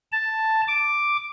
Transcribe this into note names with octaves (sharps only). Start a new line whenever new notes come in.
A5
D6